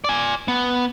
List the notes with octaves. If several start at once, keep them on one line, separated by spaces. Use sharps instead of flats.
D5 G#5
B3